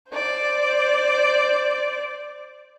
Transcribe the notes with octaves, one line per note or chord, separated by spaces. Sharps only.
C5 D5